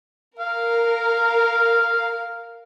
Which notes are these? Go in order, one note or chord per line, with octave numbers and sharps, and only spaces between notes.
A#4 F5